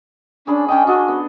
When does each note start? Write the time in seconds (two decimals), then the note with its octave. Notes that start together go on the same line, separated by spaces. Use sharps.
0.47 C#4 D4 G#4 B5
0.68 C#4 D4 D#5 G5
0.87 D4 F#4 D#5
1.08 B3